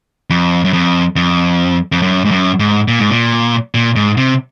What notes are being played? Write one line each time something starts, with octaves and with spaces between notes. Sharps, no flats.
F2
F#2
F2
F2
F2
F#2
G#2
F#2
G#2
A#2
G#2
A#2
A#2
G#2
C3